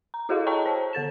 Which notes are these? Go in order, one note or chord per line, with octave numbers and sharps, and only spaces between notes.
A#5
E4 F#4 G#4 A4 D#5 F5
C#5 D#5 G5 A5 A#5 C#6
C5 A5
D3 A4 A6 E7